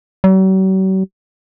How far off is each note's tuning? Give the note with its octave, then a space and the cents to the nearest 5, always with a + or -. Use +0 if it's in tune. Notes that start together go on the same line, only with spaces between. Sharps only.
F#3 +45